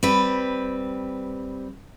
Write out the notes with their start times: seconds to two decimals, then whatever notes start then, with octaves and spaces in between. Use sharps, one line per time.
0.03 G3 C4 B4